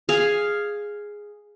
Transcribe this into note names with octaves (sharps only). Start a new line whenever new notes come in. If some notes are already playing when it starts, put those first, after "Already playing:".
G#4 F5